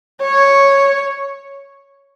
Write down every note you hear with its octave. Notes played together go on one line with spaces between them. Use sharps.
C#5